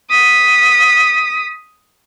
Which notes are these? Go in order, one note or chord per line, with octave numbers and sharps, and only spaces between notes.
D#6 B6